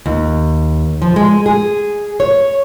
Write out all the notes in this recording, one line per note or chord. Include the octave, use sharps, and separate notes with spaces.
D#2
F3
G#3
G#4
C#5